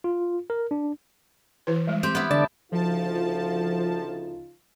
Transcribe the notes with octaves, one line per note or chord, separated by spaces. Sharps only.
F4
A#4
D4
E3 E4 B4
G3 G#3
C4 G4
B3 E4
D3 D5 A5
D2 C#3 F3 D#4 F4 A5